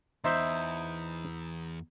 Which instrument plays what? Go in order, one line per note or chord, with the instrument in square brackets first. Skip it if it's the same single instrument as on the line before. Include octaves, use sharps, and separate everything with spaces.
[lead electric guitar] E2 [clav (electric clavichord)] D#4 C5 E5 [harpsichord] E4 [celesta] A#5 D#6 G6